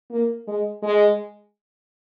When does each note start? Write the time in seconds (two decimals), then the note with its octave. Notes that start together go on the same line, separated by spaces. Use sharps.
0.11 A#3
0.47 G#3
0.83 G#3